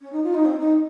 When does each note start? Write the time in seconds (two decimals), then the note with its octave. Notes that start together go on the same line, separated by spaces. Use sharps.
0.01 C#4
0.12 D#4
0.23 F4
0.34 D#4
0.45 C4
0.59 D#4